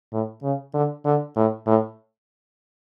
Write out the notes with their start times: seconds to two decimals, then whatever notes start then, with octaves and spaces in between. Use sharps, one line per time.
0.12 A2
0.43 C#3
0.74 D3
1.05 D3
1.36 A2
1.67 A2